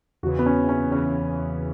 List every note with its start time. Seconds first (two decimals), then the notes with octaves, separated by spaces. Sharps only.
0.23 E2 C#3 E3 F#4
0.39 B3
0.46 C#4
0.69 C#4
0.92 E2 C#3 E3 C#4